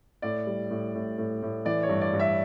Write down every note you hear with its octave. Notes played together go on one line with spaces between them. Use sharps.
A2 D5
G3
A2
A2
A2
A2
E3 D5
C#5
G2
D5
G2
E5